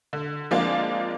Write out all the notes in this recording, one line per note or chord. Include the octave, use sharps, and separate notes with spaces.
D3
F3 G#3 A#3 C4 D4 F4